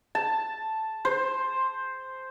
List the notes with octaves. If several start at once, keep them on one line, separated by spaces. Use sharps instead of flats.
A5
C5